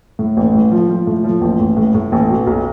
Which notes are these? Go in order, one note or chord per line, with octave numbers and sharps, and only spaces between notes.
A2
A1
A2
F3
F3
A2
F3
A1
A1
A2
A2
A1
B2
B1